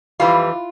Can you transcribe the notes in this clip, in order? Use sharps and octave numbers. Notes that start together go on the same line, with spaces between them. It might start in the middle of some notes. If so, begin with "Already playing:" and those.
F2 E3 G3 F4